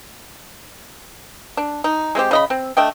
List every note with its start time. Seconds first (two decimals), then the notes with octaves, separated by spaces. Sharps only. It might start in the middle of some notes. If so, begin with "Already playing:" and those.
1.57 D4
1.84 D#4
2.15 G#3 A3 C4 G4
2.31 C#3 D#5 B5
2.50 C4
2.77 A3 D4 D#5 G5